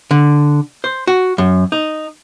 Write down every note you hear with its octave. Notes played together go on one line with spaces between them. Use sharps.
D3
C5
F#4
F#2
D#4